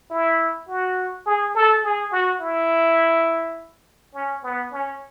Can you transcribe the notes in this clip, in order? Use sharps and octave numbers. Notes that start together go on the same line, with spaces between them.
E4
F#4
G#4
A4
G#4
F#4
E4
C#4
B3
C#4